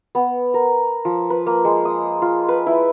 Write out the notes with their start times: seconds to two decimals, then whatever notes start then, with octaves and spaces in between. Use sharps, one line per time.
0.15 B3
0.54 A#4
1.05 F3
1.30 B4
1.46 A#3
1.65 G#3
1.85 D#6
2.22 F4
2.49 B4
2.66 E4